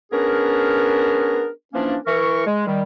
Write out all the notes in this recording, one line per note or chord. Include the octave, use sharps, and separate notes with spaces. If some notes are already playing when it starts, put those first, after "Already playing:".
B3 C#4 D4 G#4 A#4
E3 F3 A#3 C#4 D4
E3 A#4 C#6
G#3
D#3 G3